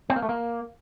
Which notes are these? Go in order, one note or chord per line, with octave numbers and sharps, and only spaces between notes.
C4
A#3
A3
A#3